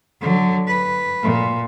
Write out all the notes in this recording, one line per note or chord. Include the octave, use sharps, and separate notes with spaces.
D3 F#3
B4
A#2